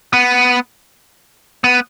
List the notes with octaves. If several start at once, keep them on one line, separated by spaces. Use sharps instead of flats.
B3
B3